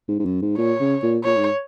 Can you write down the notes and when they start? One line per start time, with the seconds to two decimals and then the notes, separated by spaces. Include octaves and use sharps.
0.08 G#2
0.19 G#2
0.25 F#2
0.41 G#2
0.58 A#2 C#5
0.80 C#3
1.03 A#2
1.24 A#2 C#5
1.36 G#2